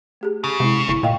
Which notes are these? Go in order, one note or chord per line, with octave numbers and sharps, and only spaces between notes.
A3 G4 G#4
C#3
C3 G#3 E4
G1 E4 C#6
A#2 D#5 F5 G5